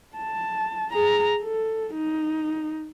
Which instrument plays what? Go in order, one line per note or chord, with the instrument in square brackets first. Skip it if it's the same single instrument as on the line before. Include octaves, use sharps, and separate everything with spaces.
[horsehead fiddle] A5
G#4 A#5
A4
D#4